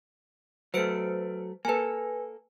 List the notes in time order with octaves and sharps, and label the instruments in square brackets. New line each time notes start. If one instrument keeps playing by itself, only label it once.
[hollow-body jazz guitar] F#3 A3 [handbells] B4 C5 D7
[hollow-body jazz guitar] A#3 A4 [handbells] B4 G#5